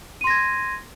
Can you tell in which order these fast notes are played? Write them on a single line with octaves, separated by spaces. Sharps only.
D#7 C6 A#6 G#6